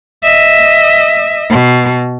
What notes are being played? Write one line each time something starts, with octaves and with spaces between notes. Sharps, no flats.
D#5 E5
B2